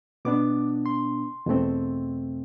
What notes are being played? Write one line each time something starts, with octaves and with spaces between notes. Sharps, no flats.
B2 B3 D4 D6
C6
E2 B2 A3 C4